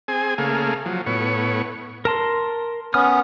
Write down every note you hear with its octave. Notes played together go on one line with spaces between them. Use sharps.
C4 G#4 G#5
C#3 A3 A#3 G#4 F5
F3 F#3
A2 B3 C#5
A#4 A5 C6
B3 C#4 D#6 F6